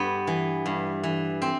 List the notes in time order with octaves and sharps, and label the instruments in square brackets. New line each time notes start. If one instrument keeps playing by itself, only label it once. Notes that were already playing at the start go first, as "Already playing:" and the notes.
Already playing: [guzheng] G2 B3
E3
G2
E3
C4